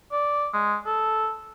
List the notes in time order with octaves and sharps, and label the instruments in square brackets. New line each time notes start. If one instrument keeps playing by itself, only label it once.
[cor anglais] D5
G#3
A4